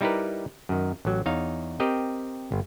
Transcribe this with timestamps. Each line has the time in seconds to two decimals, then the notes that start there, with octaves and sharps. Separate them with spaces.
0.01 G3 D#4 E4 G4 A#4 B4
0.69 F#2 D#3
1.05 A1 F#3
1.26 E2 D#4 C#5 F5
1.80 C4 G4 A#4 D#5 G5
2.52 G1